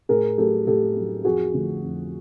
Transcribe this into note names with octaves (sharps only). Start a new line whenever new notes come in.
A2 G#4 A#4
F#3 A3 G4 A4
A2 G4 A4
F#3 A3
F2 F#4 G#4
D3 F3 A3
F2